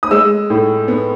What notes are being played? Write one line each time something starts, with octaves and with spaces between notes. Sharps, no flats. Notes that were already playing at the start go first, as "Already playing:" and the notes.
D#6
G#3 E6
A2
B3